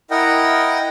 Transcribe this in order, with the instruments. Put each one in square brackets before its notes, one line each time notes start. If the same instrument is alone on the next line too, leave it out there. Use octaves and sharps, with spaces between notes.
[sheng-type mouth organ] E4 A#4 D#5 F#5 G5